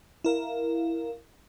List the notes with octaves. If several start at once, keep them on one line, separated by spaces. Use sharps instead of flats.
E4 A#4 F5